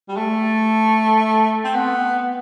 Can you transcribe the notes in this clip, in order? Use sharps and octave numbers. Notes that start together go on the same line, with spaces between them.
G3
A3
C4
B3